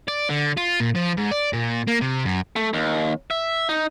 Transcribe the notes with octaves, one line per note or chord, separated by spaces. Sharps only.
D5
D3
F4
A#2
F3
G#2
D5
A#2
A#3
C3
F#2
A3
D#2
E5
D#4